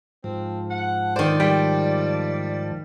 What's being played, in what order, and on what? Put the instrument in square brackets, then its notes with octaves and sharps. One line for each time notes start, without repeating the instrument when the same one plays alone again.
[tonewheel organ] G#2 F3 [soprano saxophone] C4
[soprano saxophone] F#5
[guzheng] D#3 C5 [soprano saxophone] D5
[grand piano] G3 [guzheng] G5